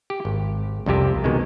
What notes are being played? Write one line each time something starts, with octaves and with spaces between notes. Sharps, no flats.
G4
G#1
C2 F2 C3 G4
B2 D#3 G#3